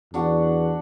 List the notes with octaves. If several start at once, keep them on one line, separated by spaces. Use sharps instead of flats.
E2 D4 F#4 F#5